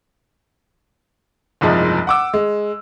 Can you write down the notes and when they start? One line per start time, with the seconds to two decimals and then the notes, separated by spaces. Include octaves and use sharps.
1.61 F#1 C2 G#2 F3 G#3
2.07 F#5 D6 E6
2.34 G#3